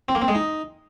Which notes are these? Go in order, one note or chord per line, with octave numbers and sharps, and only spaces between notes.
C4
A#3
C4
G#3
D#4